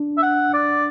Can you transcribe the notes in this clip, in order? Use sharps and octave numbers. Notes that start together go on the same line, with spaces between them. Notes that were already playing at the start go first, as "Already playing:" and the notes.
Already playing: D4
E5
F#5
D5